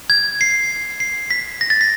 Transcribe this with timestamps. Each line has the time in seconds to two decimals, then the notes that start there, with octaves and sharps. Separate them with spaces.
0.10 G#6
0.41 C7
1.00 C7
1.31 B6
1.61 A#6
1.70 A6
1.81 B6